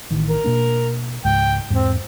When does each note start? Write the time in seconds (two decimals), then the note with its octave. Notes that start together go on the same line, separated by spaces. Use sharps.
0.11 A1 D#3 E3
0.29 A#4
0.44 B2 A#3 D4
1.25 C#2 G#2 G5
1.70 E2 G#2 C4